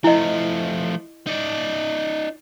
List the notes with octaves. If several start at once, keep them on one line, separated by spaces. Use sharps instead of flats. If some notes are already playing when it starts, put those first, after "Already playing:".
F3 A3 E4 D#5
D#4 D5